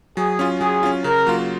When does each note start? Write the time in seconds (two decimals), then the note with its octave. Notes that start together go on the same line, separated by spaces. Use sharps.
0.17 F#3 G#4
0.39 C#4 F4
0.60 F#3 G#4
0.83 C#4 F4
1.04 C#3 A#4
1.27 F#3 A#3 F4